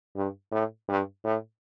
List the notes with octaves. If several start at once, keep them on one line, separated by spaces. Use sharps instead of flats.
G2
A2
G2
A2